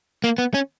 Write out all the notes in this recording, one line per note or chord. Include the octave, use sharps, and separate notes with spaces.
A#3
B3
C#4